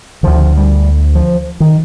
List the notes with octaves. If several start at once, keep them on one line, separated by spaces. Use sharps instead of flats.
D2 D3 F3
G3
F3
D#3